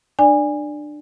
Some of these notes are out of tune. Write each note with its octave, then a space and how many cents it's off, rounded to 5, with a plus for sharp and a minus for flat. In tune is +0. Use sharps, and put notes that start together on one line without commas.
D4 +25 D5 +0 G#5 -20